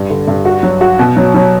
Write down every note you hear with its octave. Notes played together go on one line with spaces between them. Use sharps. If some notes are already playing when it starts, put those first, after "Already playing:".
Already playing: G2
D3
G2
F#4
F#3
F#4
B2
F#3
F#3